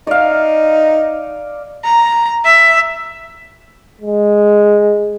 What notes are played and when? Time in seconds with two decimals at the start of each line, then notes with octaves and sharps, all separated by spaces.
0.07 D#4 D5 F5
1.85 A#5
2.45 E5
4.01 G#3